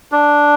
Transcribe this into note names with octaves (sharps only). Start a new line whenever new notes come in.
D4